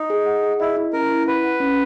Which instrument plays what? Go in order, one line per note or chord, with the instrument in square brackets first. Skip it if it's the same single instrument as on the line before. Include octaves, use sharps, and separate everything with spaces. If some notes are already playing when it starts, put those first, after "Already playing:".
Already playing: [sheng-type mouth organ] D#4
[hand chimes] G#4
F#5
G#4
[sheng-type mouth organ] E4 [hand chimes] D#5
[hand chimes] E4
[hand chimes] C#4 [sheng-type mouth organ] A#4
[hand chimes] E4
[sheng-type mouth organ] B4 [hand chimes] F#5
[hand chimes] F#5
C#4